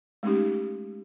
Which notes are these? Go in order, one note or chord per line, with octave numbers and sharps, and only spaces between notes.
G#3 A3 C#4 D#4 G4